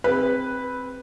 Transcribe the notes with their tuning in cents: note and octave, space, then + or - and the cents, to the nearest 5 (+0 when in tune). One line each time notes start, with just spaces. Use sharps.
C4 +0 G#4 -45 B4 +0